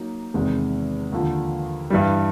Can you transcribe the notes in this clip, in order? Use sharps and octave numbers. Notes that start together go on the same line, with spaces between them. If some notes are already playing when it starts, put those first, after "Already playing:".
Already playing: F#3 A#3 D#4
E2 C3 D#3 G#3
D#2 D3 F3
G2 E3 G3